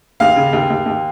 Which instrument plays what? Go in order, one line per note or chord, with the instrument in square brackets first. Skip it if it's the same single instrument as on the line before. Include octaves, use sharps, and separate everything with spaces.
[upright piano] D#2 F5
C#3
D#2
D#2
D#2